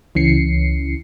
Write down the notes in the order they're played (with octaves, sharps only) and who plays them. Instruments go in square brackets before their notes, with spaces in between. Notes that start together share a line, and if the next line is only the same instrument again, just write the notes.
[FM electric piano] C#2 E3 C#4 C7 C#7